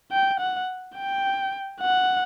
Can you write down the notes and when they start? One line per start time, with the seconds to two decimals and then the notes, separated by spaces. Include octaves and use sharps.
0.12 G5
0.40 F#5
0.96 G5
1.81 F#5